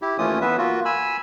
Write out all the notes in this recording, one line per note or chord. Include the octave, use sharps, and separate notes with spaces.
E4 G4
D#2 E3 A3 C#4 F4 D#6
E3 B3 B4 E5
A#3 F4 F#4
G#5 B5 E6